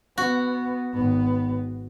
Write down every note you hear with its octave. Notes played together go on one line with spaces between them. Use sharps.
B3 F#4
G#1 B3